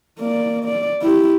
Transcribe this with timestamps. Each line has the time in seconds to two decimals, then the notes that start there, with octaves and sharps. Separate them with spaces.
0.19 A#3 D5
0.65 D5
1.02 E4 G4